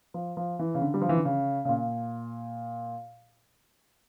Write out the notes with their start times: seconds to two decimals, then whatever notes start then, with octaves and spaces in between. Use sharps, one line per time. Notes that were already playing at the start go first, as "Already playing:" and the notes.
0.14 F3
0.37 F3
0.59 E3
0.75 C#3
0.82 D3
0.94 G3
1.02 F3
1.09 E3
1.17 D3
1.25 C#3
1.65 C#3
1.69 A#2